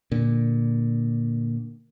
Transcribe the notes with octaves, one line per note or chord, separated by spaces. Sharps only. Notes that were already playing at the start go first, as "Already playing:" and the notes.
A#2 D3